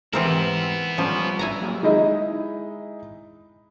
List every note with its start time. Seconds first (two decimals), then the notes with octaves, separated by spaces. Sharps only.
0.13 G#2 E3 B3 C4 E4 G4 A#4 C6
0.98 F3 G3 C#4 F4
1.39 E4 G#5 A#5
1.61 F#3 A#3 G4
1.83 G#3 D#4 E4 D#5